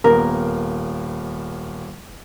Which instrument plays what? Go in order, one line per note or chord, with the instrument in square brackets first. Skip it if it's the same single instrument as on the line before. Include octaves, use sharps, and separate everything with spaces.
[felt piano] D#1 A#3 B3 [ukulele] A#4